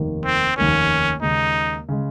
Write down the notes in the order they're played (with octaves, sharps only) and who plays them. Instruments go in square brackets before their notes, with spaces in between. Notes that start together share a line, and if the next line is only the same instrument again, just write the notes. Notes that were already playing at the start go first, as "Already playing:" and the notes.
Already playing: [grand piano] F1 D#2 D#3 A#3
[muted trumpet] C4
[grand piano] F1 D#2 D#3 A#3 [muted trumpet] C#4
[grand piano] D#2 C#3 G#3 [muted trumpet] D#4
[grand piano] C#3 G#3